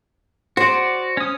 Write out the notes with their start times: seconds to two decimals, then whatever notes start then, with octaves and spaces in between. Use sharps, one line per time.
0.57 F#4 C5 D5
1.17 C#4 D#6